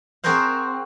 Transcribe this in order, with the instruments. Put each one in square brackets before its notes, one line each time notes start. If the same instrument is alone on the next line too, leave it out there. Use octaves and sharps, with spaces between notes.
[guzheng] C4 F#4 G#4 A#4 C5 F5